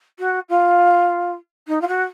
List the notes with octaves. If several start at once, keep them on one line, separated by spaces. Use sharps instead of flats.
F#4
F4
D#4
F4
F#4